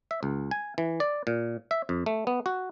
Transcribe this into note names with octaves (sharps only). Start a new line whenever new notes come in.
E5
C#2
G#5
E3
D5
A#2
E5
F2
A3
B3
F#4